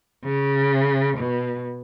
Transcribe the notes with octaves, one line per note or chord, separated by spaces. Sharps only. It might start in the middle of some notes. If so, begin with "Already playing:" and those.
C#3
B2